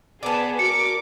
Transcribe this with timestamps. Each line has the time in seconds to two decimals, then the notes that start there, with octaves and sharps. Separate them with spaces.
0.23 B3 G#4 D5 A5
0.59 F#4 A#4 D6 C#7